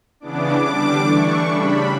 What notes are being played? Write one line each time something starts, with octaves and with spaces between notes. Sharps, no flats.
C#3 E3 B3 D4 D6
D3 G3 D4
E3 A3 D4 C#6
C#3 G3 D4 B5